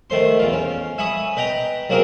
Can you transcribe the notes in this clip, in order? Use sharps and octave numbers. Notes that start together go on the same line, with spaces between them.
D#3 A3 C5 C6
E2 F4
C#4
E5 G#5 B5 C#6 D#6
B4 D#5 G5 A#5
F#3 A#3 C4 F#4 G#4 A#4